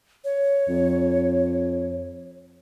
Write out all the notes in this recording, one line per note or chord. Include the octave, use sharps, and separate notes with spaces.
C#5
F2